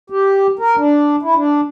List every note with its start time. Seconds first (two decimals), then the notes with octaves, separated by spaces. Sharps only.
0.10 G4
0.59 A#4
0.77 D4
1.23 E4
1.36 D4